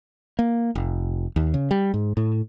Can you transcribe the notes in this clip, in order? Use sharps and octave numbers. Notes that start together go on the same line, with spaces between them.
A#3
F1
D#2
C#3
G3
G#2
A2